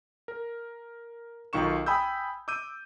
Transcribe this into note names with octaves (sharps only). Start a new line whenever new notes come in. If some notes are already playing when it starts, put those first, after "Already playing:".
A#4
B1 D#3 F4 C#6 E7
G5 G#5 B5 D#6 E6 G6
D6 E6 G6 D#7